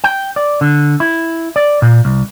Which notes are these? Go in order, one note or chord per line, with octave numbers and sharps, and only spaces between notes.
G5
D5
D3
E4
D5
A#2
C2